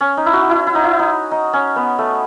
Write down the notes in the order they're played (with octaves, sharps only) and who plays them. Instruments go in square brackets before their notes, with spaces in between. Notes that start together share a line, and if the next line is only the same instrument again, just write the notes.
[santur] C#4
D#4
E4
F#4
E4
E4
D#4
E4
D#4
D#4
C#4
B3
A3